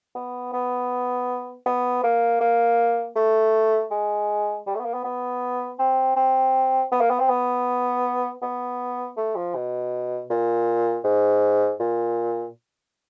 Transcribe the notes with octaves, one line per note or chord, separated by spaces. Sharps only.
B3
B3
B3
A#3
A#3
A3
G#3
G3
A3
B3
A#3
B3
B3
C4
C4
B3
A#3
B3
C4
B3
B3
A3
F3
B2
A#2
G#2
A#2